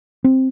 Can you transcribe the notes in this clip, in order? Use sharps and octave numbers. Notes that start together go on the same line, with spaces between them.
C4